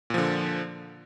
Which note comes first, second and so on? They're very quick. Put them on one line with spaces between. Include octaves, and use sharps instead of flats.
A#2 F3 D3